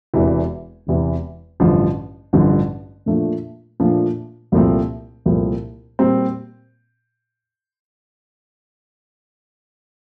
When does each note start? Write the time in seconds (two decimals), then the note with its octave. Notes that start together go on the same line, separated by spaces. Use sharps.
0.14 E1 E2 C3 E3
0.87 E1 E2 C3 E3
1.60 A1 G2 D3 F3
2.33 A1 G2 D3 F3
3.06 A#2 F3 A3 D4 F4
3.80 A#2 F3 A3 D4 F4
4.52 C2 A#2 F3 A3 C4
5.26 C2 A#2 F3 A3 C4
5.99 A#2 G3 C4